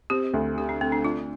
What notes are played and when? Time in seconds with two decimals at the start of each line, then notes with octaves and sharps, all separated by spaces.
0.10 C4 G4
0.34 D2
0.57 D3 G4
0.69 D4
0.81 A3 C4
0.92 D4
1.04 D4 F4